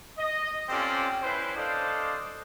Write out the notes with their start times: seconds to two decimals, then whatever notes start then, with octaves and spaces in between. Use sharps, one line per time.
0.18 D#5
0.69 C4 C#4 F4 G4 A4 D5
1.22 C#4 E4 B4 C5
1.56 D4 A4 C5 D5 D#5 F5